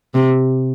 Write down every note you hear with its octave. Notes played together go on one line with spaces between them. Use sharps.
C3